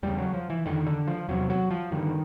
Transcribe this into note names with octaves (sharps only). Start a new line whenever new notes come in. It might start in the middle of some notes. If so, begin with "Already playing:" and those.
E2 C#3 G3
F#3
F3
E3
F2 D3 D#3
D3
F3
E2 C3 F#3
F#3
F3
G2 D3 D#3